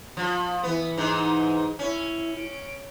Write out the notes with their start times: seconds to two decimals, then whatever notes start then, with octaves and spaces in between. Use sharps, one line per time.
0.17 F3
0.63 E3 B3
0.97 G#2 D#4
1.79 C#4 E4
2.37 D7